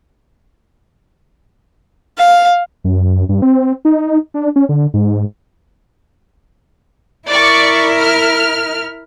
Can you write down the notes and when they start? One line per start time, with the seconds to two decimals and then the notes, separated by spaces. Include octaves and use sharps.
2.18 F5
2.84 F#2
3.29 G2
3.42 C4
3.85 D#4
4.34 D4
4.56 C#4
4.69 D3
4.94 G#2
7.28 E4 A#4 D5 C#6
7.99 F6